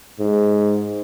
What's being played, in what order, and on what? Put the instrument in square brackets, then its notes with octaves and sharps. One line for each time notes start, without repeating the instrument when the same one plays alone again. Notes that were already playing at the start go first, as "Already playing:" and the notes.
[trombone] G#2